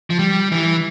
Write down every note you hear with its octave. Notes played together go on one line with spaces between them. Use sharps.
F3
G3
E3